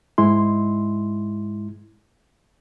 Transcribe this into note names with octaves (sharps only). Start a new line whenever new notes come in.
G#2 G#3 E4 C6